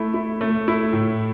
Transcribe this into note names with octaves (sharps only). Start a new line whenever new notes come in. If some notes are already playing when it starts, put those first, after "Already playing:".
Already playing: A3 E4
E4
A3
E4
A2